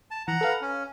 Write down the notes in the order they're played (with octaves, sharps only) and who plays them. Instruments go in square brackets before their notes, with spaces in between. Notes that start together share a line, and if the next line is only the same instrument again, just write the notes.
[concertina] A5
[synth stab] E3 [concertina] F#5 A#5
[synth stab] A4 B4 F5
[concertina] C#4